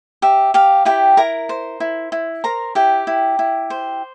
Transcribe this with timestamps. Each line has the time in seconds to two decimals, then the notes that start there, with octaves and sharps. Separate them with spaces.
0.22 G4 E5
0.54 G4 F5
0.85 E4 G4 G5
1.17 E4 A#4 A#5
1.49 C5
1.80 E4
2.12 E4
2.44 A#4 C5 A#5
2.75 E4 G4 G5
3.07 E4
3.39 E4
3.70 C5